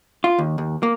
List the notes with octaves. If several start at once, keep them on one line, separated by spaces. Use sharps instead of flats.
F4
D#2
D#2
A#3